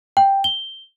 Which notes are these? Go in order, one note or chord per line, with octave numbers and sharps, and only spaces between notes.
G5
G7